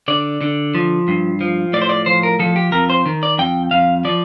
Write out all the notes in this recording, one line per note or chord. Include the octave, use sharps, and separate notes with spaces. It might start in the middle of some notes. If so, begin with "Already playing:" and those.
D3 D5
D3
F3
G2
F3
A2 D5
C5
D5
F3 C5
A#4
F3 A4
G4
F2 A#4
C5
D#3
D5
F2 G5
F2 F5
F3 D5